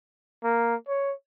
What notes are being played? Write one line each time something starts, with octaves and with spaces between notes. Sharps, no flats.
A#3
C#5